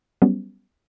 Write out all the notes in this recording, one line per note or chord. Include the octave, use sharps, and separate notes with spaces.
F#3 G3 B3 C#4